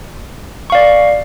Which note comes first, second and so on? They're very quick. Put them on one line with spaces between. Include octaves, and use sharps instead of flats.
C#6 F5 D5